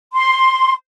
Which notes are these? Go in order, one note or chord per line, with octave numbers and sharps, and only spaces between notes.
C6